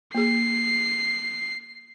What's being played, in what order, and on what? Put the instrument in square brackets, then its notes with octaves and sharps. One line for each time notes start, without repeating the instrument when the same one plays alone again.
[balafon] A#3 G#4 [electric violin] C7